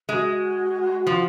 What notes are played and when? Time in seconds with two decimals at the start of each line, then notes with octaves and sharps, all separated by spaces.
0.09 G#3 F#4
1.07 F3